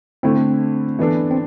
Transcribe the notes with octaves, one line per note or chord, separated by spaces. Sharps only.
D3 A3 C4 E4
E3 B3 D4 A4
C4